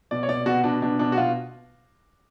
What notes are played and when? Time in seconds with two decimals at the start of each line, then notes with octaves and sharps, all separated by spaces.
0.11 B2 D5
0.23 C#5
0.28 B2 D5
0.46 B2 F#4
0.64 B2 D4
0.82 B2 D4
0.99 B2 D4
1.12 F#4
1.17 B2 F4